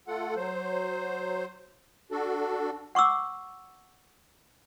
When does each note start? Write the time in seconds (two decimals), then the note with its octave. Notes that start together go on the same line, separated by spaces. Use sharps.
0.07 A3 F4 A4 F#5
0.36 F#3 C5
2.11 D4 F#4 A4
2.95 F#5 C#6 D6 E6